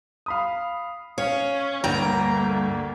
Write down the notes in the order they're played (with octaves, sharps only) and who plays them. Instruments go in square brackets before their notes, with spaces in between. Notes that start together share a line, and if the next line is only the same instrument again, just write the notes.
[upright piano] F5 B5 D#6
[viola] C#4 [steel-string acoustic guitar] C#5 [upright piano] F5
[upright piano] D2 G5 A#6 [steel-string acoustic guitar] G2 A#5 [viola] A3 A#3